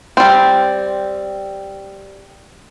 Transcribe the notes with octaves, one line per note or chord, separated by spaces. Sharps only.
G3 C4